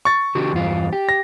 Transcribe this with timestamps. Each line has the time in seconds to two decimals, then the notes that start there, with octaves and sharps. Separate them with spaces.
0.05 C#6 A6
0.35 D3 F#4 G4
0.53 E2 G2 F4
0.93 G4
1.09 A#6